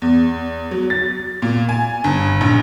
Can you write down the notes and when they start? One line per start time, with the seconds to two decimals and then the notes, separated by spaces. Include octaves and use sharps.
0.02 E2
0.71 F#3
0.90 A6
1.42 A#2
1.69 G#5
2.04 G1
2.41 A#1